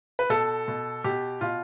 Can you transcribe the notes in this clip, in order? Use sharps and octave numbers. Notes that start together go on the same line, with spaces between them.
B4
B2 A4
B2
B2 G4
B2 F4